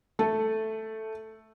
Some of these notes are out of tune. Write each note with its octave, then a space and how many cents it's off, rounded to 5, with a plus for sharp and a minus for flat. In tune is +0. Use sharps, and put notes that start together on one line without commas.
A3 +0 A4 +0